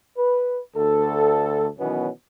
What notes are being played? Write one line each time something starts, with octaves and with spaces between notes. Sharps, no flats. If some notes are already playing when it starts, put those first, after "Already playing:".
B4
D2 A4
B2 D#3 E3 F#3 B3 C#4